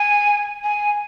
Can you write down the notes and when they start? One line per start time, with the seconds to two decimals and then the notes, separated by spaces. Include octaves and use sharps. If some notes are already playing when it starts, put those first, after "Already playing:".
Already playing: G#5
0.64 G#5